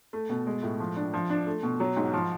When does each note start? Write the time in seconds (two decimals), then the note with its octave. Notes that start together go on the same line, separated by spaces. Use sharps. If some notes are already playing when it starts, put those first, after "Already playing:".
0.13 A3
0.29 B2
0.47 G#3
0.63 A2
0.80 F3
0.96 D4
1.14 F3
1.30 D4
1.47 A3
1.63 B2
1.80 F#3
1.96 G#2
2.13 F3